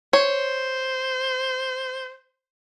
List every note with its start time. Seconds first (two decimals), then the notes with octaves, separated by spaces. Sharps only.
0.13 C5 C#5